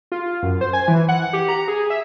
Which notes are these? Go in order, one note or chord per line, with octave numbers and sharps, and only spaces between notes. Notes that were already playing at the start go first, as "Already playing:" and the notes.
F4
F#2
C5
G#5
E3
F#5
G4
A#5
G#4
E5